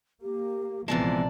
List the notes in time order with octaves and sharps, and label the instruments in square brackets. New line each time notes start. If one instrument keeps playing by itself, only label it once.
[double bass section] A#3 [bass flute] G4
[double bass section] A#1 F3 [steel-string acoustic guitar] C3 D5 A5 [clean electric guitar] E3 G#3 [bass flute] B3